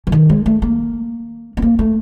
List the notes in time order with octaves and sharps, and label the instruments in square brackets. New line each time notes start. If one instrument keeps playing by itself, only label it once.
[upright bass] E3
D#3
G#3
A3
A#3
B3
A#3
A3